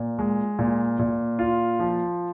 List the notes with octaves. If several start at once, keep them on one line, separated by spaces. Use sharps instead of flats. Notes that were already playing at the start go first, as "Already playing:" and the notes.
Already playing: A#2
G#3
A#2
A#2
F4
F3